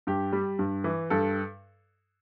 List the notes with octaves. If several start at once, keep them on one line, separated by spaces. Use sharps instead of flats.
G2 G4
G3
G2
E3
G2 A4